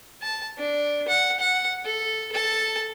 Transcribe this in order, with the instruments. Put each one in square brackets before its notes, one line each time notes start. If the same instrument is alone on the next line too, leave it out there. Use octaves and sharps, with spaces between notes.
[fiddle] A5
D4
F#5
F#5
A4
A4 A5